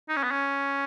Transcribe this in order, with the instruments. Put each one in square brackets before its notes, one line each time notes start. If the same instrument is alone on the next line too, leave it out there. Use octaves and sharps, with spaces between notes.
[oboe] D#4
C#4
B3
C#4